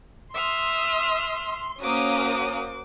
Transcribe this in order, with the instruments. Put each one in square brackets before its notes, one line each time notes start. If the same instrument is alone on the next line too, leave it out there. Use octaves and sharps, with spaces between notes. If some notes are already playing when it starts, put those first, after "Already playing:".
[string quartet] E5 D#6 F6 [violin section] C6
[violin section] A#3 C#4 D#6 [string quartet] F#4 C5 D6